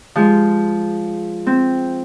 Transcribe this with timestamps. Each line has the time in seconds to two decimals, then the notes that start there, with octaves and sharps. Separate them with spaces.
0.16 F3 G#3
1.47 C4